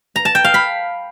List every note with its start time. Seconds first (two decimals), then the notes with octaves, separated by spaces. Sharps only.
0.16 A#5
0.25 A5
0.35 G5
0.44 F5
0.54 B5